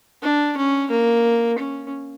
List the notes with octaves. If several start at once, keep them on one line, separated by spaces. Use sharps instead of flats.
D4
C#4
A#3
C#4